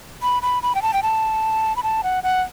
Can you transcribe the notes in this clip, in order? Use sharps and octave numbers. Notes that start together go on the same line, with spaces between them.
B5
B5
B5
G5
A5
G5
A5
B5
A5
F#5
F#5